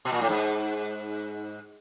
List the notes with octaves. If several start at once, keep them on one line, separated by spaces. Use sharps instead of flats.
B2
A#2
A2
G#2